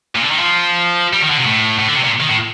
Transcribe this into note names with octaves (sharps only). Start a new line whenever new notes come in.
A#2
D3
D#3
F3
G3
D#3
D3
C3
A2
A2
D3
C3
A#2
D#3
A2